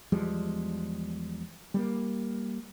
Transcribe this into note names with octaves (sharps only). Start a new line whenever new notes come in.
E2 F3 G3 G#3
G3 A3 A#3